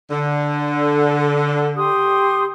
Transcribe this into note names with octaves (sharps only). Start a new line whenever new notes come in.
D3
G4 C6 D#6